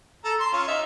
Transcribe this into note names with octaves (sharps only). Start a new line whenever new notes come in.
A4 A#5
C6
C#4 F4
D#4 E5